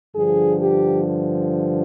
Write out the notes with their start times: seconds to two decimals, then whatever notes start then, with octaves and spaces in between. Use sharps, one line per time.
0.15 G2 D3 F3 G#4
0.60 G4